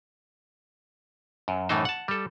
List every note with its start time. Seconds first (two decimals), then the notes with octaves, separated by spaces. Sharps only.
1.48 F#2
1.69 F#2 A2 E3 A3 D#4 C5
1.85 F#5 A5
2.08 G3 A4